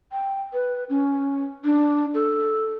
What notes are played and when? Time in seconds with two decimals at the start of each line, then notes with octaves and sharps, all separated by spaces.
0.12 G5
0.53 B4
0.90 C#4
1.64 D4
2.14 A4